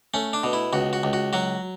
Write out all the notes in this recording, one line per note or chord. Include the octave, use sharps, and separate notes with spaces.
A3 C#4
D4
B2
E4
C#2 F#4
F#4
C#2
F#4
F#3 F#4